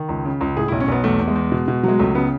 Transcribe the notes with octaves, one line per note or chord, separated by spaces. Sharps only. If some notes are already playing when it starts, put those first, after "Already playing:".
Already playing: D#3
C#2
C#3
C#2
A2 G#4
E4
B1
C#4
B1 B3
E2 A3
E2
G#3
E2
B2
B2
F#3 G#3
C#2 A3
C#3 B3